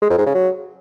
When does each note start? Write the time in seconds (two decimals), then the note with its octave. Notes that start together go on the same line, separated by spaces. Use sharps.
0.02 G#3
0.10 F2
0.18 G#2
0.26 C#3
0.34 F#3